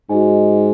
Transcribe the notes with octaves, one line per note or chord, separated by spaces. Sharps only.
G#2 F#4 D#5 G#5